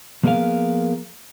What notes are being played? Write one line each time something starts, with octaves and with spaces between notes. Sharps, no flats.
F3 A#3 B3 G#4 A#4 F5